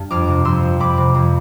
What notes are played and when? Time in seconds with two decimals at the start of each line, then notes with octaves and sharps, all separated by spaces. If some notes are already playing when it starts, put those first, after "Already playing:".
Already playing: G2
0.10 F2 D6 F6
0.28 C3
0.45 F2 C6 E6
0.63 F3
0.80 F2 B5 D6
0.97 C3
1.14 F2